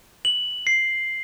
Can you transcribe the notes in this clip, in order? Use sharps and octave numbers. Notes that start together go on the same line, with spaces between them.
F#7
C7